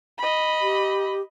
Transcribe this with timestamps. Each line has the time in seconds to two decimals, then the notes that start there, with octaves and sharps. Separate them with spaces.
0.18 D#5 B5
0.62 G4